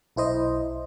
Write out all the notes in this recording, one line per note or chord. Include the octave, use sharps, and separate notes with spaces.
B1 E4 C5 D#5